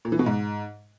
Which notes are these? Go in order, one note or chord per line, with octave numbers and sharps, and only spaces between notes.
A#2
E3
B2
G#2